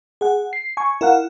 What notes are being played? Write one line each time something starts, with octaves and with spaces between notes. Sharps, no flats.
G#4 F#5
C7
G#5 C#6
E4 A#4 F5 F#5